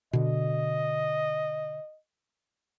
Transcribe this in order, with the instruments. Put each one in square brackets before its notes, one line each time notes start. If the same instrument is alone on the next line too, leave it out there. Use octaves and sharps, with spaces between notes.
[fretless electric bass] B2 D3 [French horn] D#5